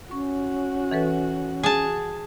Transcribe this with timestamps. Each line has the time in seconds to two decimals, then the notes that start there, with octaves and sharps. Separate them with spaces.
0.11 C#4 F#4 C#6
0.91 E3 A4 B4
1.63 G#4 A5